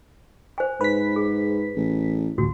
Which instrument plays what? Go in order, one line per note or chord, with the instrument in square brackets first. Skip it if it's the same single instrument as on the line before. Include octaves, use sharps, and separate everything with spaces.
[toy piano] C5 G#5
[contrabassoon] G#2 [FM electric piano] B4 B6 [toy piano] B5
[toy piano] G#4
[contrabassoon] A1
[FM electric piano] A1 D2 [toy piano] F#4